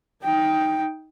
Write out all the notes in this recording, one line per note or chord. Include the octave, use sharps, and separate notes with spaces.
D#4 G5